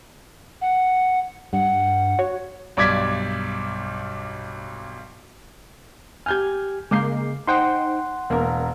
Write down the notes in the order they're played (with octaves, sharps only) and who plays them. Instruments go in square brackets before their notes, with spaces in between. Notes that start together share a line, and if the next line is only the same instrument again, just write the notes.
[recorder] F#5
[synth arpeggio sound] G2 [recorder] F#5
[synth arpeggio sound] F#4 C#5
[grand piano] B1 G2 D5 D6 G#6 B6
[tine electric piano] G4 G#5 [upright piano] F6 G6 G#6
[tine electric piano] C#3 [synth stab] G#3 A#3 [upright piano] D6 G6 C7
[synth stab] D#4 C5 G5 [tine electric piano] F#5 C6
[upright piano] E1 A#4 [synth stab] A#3